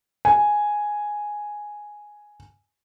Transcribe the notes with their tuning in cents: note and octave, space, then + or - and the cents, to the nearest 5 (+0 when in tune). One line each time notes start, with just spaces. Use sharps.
G#5 +0